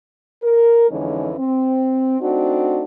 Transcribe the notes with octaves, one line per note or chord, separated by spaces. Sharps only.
A#4
F2 D3 E3 G#3 C#4 D#4
C4
A3 C4 D4 D#4 F#4